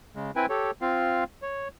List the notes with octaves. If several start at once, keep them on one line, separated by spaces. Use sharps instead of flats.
C#3 G#3
C4 E4 B4 G5 G#5
G4 A4 C#5
C4 F4 F5
C#5